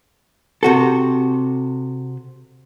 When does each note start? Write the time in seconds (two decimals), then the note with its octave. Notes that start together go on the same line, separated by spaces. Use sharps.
0.63 C3 F#4 A4